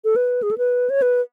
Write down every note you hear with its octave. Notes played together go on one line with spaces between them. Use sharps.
A4
B4
G#4
A4
B4
C#5
B4